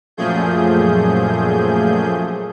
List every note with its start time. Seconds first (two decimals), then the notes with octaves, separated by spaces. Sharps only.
0.17 F#2 A#2 F3 A3 G#4 G6